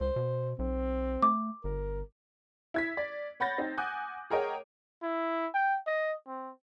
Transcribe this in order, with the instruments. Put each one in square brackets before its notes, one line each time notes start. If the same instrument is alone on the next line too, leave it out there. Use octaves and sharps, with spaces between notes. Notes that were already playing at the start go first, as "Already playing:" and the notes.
[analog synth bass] C#2 [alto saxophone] C5
[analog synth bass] B2
[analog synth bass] B1 [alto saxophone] C4
[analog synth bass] A3 [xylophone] D6
[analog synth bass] G1 [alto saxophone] A#4
[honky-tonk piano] E4 G#6 B6
D5
C#5 F#5 B5 G6 A6 A#6
C4 D#4
F#5 G#5 D6 D#6 F#6 G6
G#4 A#4 C#5 D#5 F#5 G5
[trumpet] E4
G5
D#5
C4